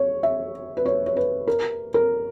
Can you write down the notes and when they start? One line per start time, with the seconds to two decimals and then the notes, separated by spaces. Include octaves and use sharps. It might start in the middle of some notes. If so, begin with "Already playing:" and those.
Already playing: C#5
0.23 E5
0.77 B4
0.86 C#5
1.06 C#5
1.16 B4
1.48 A#4
1.94 A#4